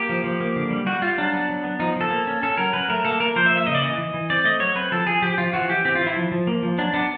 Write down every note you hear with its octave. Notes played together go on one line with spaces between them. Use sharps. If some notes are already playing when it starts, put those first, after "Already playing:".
Already playing: A#3 G4
F3
F3
A#3
D3
G3
G3 F#4
G3 F4
F#3 D4
B3
F#3
B3
F3 D#4
F3 A4
A#3
C#4
C#4 A4
F#3 A#4
F#3 B4
A3 A#4
A#3 A4
A#3 A#4
F3 C5
E5
A#3
E5
C#3 D#5
D5
E3 D#5
E3
E3
C4 D5
A3 D#5
F#3 C#5
C4 B4
F3 A4
F3 G#4
F3 G4
F3 F4
E3 F#4
E3 G4
C4 G4
F4
E3
E4
F3
F3
A#3
F3
F#3 D4
B3 D4